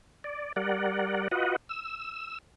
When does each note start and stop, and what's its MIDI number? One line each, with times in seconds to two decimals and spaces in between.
0.24 0.53 74
0.56 1.28 55
0.56 1.28 70
0.56 1.28 74
0.56 1.28 78
1.31 1.56 65
1.31 1.56 66
1.31 1.56 71
1.31 1.56 75
1.31 1.56 78
1.69 2.39 88